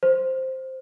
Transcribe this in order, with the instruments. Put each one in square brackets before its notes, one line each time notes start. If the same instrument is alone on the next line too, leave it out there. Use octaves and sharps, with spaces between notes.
[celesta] C5